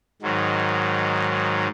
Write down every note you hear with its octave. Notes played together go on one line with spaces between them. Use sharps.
G#2 D#3 F#3